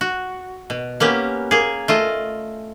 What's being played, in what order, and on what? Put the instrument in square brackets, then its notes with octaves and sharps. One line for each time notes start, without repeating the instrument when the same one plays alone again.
[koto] F#4
B2
A#3 B3 C#4 G4
A#3 G#4
A3 F4 D#5